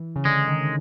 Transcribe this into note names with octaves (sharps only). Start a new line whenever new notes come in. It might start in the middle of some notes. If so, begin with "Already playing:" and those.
Already playing: E3
C#3
D3 G#3
D#3